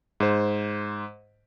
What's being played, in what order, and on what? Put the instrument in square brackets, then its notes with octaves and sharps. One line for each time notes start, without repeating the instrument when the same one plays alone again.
[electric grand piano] G#2 C5